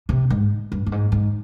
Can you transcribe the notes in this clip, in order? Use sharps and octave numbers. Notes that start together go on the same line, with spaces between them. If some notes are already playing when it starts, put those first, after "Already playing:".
C3
G#2
G2
G2
G#2
G#2